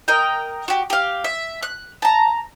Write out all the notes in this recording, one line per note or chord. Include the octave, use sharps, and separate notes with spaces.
A#4 D#5 G5
F#4 G4
G4 F5
E5
F#6
A5 A#5